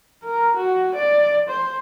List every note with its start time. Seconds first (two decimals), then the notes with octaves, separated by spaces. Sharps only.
0.24 A#4
0.56 F#4
0.95 D5
1.49 C5